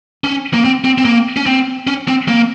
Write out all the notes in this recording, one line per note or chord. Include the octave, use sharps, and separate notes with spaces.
C#4
A#3
C4
C4
C4
A#3
C#4
C4
C#4
C4
A#3